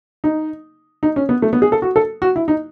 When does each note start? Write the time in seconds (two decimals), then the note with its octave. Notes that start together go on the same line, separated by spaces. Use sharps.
0.24 D#4
1.03 D#4
1.16 C#4
1.29 B3
1.42 A3
1.53 B3
1.62 G#4
1.72 A4
1.82 F#4
1.96 A4
2.22 F#4
2.36 E4
2.48 D#4